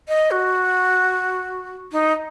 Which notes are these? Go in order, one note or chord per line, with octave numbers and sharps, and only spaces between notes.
D#5
F#4
D#4